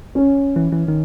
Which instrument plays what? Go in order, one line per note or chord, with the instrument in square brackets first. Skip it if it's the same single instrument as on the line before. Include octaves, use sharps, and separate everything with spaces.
[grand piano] C#4
[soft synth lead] E3
E3
D#3